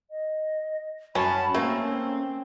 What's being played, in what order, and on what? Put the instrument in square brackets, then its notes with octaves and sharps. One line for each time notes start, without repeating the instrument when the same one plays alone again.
[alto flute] D#5
[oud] F#2 [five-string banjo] C#4 [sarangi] A5 [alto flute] B5
[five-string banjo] A3 [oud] A#3 [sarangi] C4 [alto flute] C#4